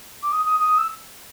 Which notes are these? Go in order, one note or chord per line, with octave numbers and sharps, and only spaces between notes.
D6
D#6
D#6
D#6
E6